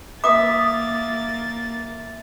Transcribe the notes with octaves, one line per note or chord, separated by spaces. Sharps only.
A#3 E5 D6 D#6 A6